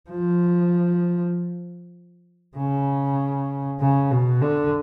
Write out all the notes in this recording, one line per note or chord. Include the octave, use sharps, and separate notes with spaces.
F3
C#3
C#3
B2
D3